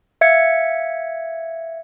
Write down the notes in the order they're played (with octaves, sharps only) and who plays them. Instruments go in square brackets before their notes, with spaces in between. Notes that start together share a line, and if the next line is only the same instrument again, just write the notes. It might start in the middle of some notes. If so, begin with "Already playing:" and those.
[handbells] E5 F5 G#6 C#7